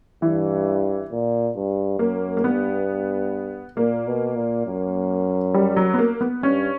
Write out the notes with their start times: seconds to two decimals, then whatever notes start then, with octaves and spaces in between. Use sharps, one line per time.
0.22 G2 E3
1.11 A#2
1.56 G2
1.99 F#2 A#3
2.37 A#3
2.44 G2 B3
3.77 A#2 A#3
4.07 B2
4.35 A#2
4.66 F#2
5.54 G3
5.77 F#3
5.94 B3
5.99 A#3
6.21 B3
6.42 G2 C#4